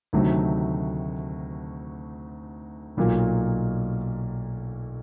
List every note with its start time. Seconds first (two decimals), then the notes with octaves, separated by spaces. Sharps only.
0.13 D2 C3 D#3 F#3 A3
2.97 B1 A#2 F#3 A#3